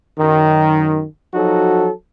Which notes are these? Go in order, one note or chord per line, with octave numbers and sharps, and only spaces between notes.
F#2 D#3
F3 F#3 D#4 F#4 A4